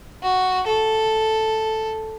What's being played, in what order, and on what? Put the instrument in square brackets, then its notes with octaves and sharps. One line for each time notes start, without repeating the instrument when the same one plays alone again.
[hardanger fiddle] F#4
A4